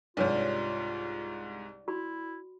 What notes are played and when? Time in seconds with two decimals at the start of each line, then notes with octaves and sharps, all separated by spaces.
0.17 C2 G#2 G3 D4 F4 B4 C#5
1.88 E4 F#4 B5